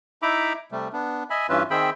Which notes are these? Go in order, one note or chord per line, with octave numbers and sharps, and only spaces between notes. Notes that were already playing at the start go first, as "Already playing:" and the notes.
D#4 E4 E5 A#5 B5 D6
C3 G3 A3
B3 D4
D#5 E5 G#5 B5
G2 E3 C#4 F4 B4 E5
D#3 C4 G#4 E5 G5 B5